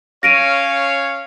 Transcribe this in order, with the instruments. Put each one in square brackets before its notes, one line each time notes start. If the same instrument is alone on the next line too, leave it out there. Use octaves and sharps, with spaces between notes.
[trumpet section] C#4 C#5 F5 [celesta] A#6 D7 D#7